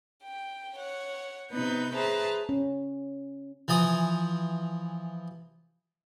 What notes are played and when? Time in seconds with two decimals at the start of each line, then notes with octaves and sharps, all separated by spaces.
0.24 G5
0.75 C#5 F#5
1.51 C3 B3 D#4 B4 G6
1.93 G#4 B4 C5 E5 A5 A#5
2.49 C#4
3.68 E3 F3 G#5 D#6